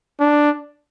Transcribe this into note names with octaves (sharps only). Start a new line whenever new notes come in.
D4